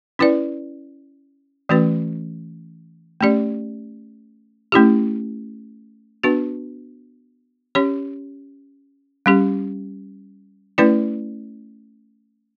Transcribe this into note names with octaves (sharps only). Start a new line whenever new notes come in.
C#4 E4 B4 D5
E3 A3 C#4 F#4 B4
A3 C#4 G4 D5
A3 C#4 E4 G4
B3 D4 F#4 B4
C#4 G4 C#5
G3 C#4 G4
A3 C#4 E4 B4 D5